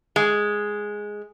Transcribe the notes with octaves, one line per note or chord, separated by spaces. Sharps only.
G#3